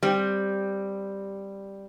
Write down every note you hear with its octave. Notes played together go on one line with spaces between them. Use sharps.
G3 C4